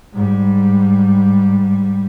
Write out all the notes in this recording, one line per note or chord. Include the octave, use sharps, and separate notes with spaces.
G#2 G3